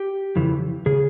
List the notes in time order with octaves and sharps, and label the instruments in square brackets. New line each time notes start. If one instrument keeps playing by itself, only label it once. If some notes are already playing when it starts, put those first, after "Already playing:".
Already playing: [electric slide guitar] G4
F2 C#3 E3
C#3 G#4